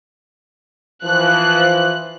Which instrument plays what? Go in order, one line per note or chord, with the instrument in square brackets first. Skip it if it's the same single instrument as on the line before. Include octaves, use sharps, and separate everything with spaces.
[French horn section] E3 F3 [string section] F#6